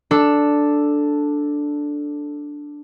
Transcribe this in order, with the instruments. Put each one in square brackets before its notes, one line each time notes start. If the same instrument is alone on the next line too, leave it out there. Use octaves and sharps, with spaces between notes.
[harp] D4 A4